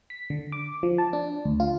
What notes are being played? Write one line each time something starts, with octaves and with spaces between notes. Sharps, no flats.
B6
D3
D6
F3
A5
D4
D2
F4